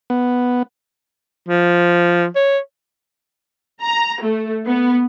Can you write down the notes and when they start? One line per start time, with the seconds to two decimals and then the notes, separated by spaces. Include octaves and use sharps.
0.10 B3
1.48 F3
2.36 C#5
3.83 A#5
4.22 A3
4.66 B3